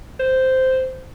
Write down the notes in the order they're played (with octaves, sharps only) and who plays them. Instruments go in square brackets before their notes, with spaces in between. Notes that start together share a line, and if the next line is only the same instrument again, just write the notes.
[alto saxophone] C5